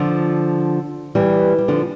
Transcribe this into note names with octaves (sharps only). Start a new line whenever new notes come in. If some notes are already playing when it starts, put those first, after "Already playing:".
Already playing: D3 F3
E3 G3
G3
D3 F3